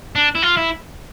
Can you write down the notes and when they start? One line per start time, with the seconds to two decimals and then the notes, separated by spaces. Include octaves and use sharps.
0.16 D4
0.35 E4
0.43 F4
0.57 E4